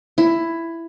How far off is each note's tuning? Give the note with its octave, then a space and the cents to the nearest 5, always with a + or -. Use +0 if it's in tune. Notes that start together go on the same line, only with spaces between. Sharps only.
E4 +10